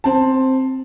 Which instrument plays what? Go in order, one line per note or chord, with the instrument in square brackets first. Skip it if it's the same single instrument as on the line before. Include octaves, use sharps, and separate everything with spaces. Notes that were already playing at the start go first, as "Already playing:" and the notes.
[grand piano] C4 A5